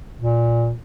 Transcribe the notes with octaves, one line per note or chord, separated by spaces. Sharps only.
A#2